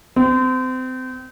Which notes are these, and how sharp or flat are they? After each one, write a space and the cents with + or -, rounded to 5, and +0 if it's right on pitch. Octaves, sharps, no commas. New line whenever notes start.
C4 -30